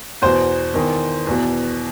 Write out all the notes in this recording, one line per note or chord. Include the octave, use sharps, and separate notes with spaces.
E2 B2 C5
E2 D#3
E2 B2